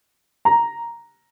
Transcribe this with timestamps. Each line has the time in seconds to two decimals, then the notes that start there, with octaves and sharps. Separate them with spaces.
0.45 A#5